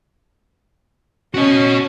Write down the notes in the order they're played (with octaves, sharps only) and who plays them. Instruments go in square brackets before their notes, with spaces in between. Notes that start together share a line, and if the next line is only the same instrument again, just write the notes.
[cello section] C#4 [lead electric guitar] F#4 D#5